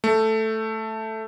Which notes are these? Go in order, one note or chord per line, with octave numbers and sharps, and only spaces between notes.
A3